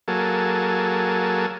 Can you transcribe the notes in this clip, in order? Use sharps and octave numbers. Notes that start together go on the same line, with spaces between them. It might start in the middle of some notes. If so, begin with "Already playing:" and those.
F#3 A#3 G#4 A4